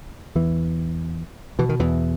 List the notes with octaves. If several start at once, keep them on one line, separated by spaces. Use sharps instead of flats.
E2 E3
B2 E3
D#3
E2 E3